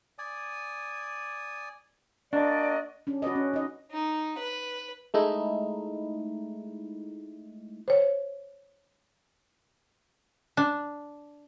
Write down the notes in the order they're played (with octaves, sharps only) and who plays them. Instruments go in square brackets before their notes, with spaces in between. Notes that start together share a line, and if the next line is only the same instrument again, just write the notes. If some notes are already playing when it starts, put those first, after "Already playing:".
[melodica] D5 G#5 D#6
[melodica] A#3 F#4 [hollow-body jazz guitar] D4 [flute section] D5 D#5
[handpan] C#4 D4
F#4 B4 D5 D#5
C#4
D#4 D#5
[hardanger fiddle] D#4
B4
[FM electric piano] G#3 A3 D#4 E4
[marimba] C5 C#5
[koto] D4